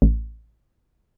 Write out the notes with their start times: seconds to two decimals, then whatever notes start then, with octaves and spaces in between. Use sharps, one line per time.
0.02 A1